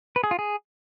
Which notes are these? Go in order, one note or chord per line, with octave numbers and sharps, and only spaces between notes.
B4
G#4
F4
G#4